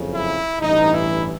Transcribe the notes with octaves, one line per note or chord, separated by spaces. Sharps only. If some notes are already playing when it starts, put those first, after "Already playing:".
Already playing: F#1 F2 C#3
E4
A1 G2 E3 D#4
E4